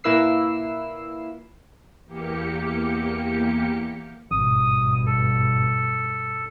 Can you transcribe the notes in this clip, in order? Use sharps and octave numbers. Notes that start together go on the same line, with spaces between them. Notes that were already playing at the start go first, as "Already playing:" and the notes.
A#2 A#3 E4 B4 E6 C7
E2 A#3 G4 C#7
G#1 G2 B2 D#6
A4